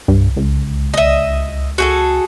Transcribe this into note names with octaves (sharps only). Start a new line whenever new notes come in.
C2 G2
C#2
D#5 E5
F#4 G#4 A4